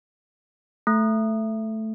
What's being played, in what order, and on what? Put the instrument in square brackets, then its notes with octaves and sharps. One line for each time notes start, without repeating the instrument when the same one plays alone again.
[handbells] A3